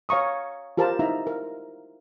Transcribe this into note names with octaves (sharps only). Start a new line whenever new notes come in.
C#5 F5 A#5 C#6 D#6
F4 G4 A#4 C5 A5
D#4 E4 E5 A#5
A#4